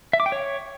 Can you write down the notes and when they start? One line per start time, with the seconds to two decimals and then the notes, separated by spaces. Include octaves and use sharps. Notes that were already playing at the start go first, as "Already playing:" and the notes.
0.13 E5
0.20 D6
0.26 G5
0.32 C#5